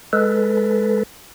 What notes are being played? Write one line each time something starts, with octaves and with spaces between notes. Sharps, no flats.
G#3 A4 B4